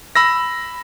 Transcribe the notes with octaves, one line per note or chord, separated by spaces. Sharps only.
B5 E6 A#6